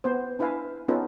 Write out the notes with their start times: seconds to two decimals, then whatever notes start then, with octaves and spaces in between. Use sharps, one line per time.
0.04 B3 C5
0.39 D4 E4 B4 E5 F5 G#5
0.88 B3 C#4 D#4 F4 A4 B4